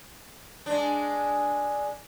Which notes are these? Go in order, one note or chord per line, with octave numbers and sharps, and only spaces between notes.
G#3 D4